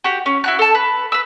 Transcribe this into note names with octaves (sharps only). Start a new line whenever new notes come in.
F#4 G4
C#4
E4 F#4 F#6
A4 A5
B4
B4 E6